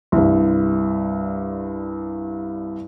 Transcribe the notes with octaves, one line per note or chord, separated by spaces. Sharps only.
C2 G2